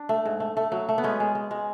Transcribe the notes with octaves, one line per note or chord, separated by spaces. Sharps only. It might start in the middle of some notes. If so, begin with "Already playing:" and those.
Already playing: D4
A3
G#2
A3
A3
F#3
A3
B3
G#3 C#4
G#3
G#3
G#3